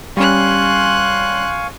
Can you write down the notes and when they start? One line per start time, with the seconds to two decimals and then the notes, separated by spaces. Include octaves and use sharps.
0.17 G3 C#4 F5 G#5 C6 C#6 F#6